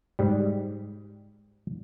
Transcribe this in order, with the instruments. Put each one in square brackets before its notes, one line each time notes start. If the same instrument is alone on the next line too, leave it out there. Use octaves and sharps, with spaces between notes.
[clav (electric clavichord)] G#2 G3